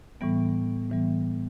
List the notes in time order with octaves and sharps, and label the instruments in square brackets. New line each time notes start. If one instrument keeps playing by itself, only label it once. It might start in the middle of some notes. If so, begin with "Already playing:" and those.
[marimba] A2 E3 G3 B3
A2 E3 G3 B3